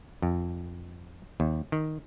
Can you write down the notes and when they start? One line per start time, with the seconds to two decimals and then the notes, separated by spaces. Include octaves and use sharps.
0.22 F2
1.40 D#2
1.72 D#3